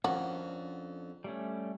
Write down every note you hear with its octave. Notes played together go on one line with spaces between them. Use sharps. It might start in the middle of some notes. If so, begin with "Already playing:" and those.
F2 C#4 D4 F#4 A#4
G3 A3 C#4